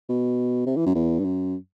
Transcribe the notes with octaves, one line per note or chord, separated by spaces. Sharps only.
B2
C3
E3
F#2
E2
G2
F#2